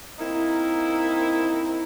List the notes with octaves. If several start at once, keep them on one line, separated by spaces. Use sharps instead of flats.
A#3 C4 D#4 E4